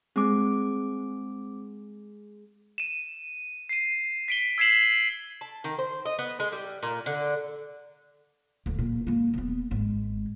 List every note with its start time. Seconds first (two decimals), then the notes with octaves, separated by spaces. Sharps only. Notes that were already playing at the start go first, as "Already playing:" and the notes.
0.16 G#3 C4 D6
2.78 D#7 E7
3.69 C7 D#7
4.28 B6 D7 G7
4.58 E6 G#6 B6 C7 E7 F#7
5.41 A5
5.64 D#3
5.79 C5
6.06 D#5
6.19 B3
6.40 G#3
6.52 G3
6.83 A#2
7.06 D3
8.66 D1 D2
8.79 A#2
9.07 G#2 A#3
9.34 D#1 B3
9.71 G#1 G#3